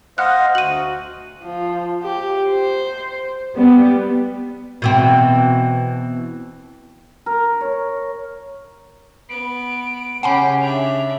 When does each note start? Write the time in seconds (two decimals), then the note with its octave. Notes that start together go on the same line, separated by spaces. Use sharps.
0.18 C5 D#5 F5 F#5 F6 F#6
0.55 D2 F#4 D#7 F#7
1.43 F3
2.03 G4
2.50 C5
3.56 G3 B3
4.82 B2 E3 C4
7.26 A#4
7.61 C#5
9.29 B3 D7
10.23 C#3 C#4 G4 F#5 G#5 B5 C7
10.61 D4 E5 F7